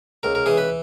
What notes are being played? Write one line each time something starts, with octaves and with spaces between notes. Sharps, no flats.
C#2 A#4
A#4
E3 G#4
B4